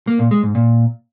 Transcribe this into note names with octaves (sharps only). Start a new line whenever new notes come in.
A#3
A#2
G#3
G#2
A#2